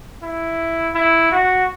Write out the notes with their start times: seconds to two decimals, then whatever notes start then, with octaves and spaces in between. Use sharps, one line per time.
0.23 E4
0.95 E4
1.32 F#4